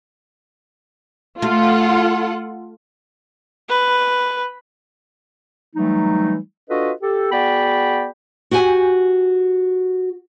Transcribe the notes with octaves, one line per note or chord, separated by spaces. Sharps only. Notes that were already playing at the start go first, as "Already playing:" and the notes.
A3 F4 A4 F#5
B4
E3 F#3 G3 A3 D#4
D4 F4 F#4 A4 B4 D#5
G4 A4
B3 F#4 G#4 D5 G5 B5
F#4 G4 F#5 G#5